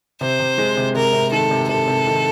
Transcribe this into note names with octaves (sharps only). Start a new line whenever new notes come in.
C3 C5
C3
G#3
C3
C3 A#4
C3
D#3 A4
C3
C3 A4
C3
D#3